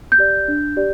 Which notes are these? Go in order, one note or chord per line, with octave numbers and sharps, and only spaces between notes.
G6
G4 D5
D4
G4 D5